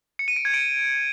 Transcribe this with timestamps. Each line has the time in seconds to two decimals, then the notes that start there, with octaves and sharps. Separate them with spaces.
0.19 C#7
0.28 D#7
0.36 D7
0.45 G#6
0.54 D7